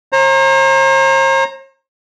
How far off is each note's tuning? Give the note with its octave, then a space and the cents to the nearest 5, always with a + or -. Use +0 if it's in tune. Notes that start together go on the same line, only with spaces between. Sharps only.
C5 +45 A#5 -5